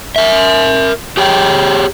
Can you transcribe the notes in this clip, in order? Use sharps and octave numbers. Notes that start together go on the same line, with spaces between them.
A#4 E5
G4 G#4 C#5 G5